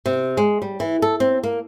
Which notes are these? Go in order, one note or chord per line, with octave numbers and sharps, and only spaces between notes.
C3
G#3
G3
E3
A4
C4
A#3